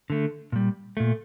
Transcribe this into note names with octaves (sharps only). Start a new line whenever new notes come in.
D3 A3
A#2 G3
A#2 A3